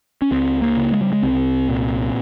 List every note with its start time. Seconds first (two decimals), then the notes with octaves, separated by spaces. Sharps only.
0.22 C#4
0.31 C#2 C4
0.62 A#3
0.77 C#3
0.92 G#3
1.02 G3
1.13 G#3
1.22 C2 C4
1.68 A#2